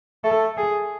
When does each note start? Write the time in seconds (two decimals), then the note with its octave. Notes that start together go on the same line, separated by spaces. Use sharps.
0.24 A3 A4
0.57 G#4